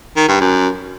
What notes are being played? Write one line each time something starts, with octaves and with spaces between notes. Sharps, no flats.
D#3
G2
F#2